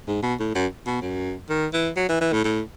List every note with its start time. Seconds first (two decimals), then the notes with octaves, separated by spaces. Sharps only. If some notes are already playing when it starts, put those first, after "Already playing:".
0.07 G#2
0.23 B2
0.40 A2
0.55 F#2
0.86 B2
1.02 F#2
1.50 D#3
1.73 E3
1.96 F#3
2.09 E3
2.21 E3
2.32 A2
2.44 A2